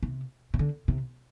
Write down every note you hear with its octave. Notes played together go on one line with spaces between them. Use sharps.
C3
C3
D3
C3